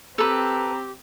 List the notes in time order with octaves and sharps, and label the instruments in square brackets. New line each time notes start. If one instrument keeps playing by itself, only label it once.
[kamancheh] C4 [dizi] G4 [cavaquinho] A4 B4 [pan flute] A#5